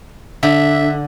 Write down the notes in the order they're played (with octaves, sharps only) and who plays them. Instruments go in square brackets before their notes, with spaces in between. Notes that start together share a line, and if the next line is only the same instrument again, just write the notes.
[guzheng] D3 [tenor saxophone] E5